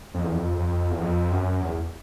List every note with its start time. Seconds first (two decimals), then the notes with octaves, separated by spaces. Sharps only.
0.14 F2
0.24 E2
0.34 F2
0.58 F2
0.91 E2
1.02 F2
1.31 F#2
1.62 E2